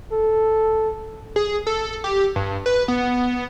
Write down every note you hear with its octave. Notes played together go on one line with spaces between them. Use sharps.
A4
G#4
A4
G4
G2
B4
B3